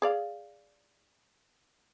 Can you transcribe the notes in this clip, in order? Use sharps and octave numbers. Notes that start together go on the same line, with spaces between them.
G#4 D5 F5